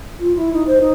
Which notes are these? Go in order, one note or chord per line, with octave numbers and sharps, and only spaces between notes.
F4
E4
D#4
C5
D#4